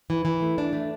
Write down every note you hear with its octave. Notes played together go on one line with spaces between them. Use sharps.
E3
E3
A3
D4
A3